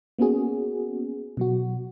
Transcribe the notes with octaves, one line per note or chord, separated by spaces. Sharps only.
A#3 B3 C#4 F#4 G#4
B2 F#3 F#4